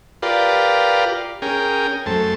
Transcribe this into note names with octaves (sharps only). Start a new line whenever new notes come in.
F4 G4 A#4 B4 D5 F5
C#4 G#4 A#4 G5
F#2 A3 C5 A5